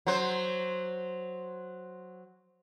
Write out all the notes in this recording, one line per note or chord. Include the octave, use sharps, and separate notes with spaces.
F#3 C5